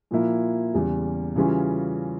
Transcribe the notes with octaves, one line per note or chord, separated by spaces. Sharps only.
A#2 F3 A#3 E4
E2 C#3 G3
C#3 E3 G3 C#4 F4